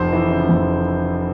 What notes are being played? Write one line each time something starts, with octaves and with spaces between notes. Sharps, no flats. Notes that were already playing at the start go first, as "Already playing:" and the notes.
Already playing: F1 F2 C5
E3
C#3
F2